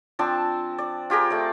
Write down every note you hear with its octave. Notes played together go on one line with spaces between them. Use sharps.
F3 C4 D4 A5
D5
F4 G4 G#4 A#4
A3 D5